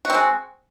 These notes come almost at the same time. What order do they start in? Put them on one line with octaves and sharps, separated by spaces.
F#4 C4 G#3